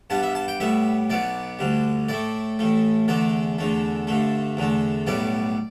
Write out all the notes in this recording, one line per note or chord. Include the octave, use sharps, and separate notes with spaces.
G2 G3 B3 A5
E5
A5
G5
A2 G3 B3 E5
B1 B2 B3 D5
D2 D3 G3
A2 A3 D5
A1 A2 A3
E2 D3 A3 D5
E2 D3 A3
G2 D3 A3
E2 D3 A3
B1 A2 G3 B3 D5